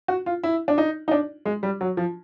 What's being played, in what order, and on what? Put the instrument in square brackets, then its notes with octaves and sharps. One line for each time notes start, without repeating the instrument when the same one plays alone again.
[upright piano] F#4
F4
E4
D4
D#4
D#4
D4
G#3
G3
F#3
F3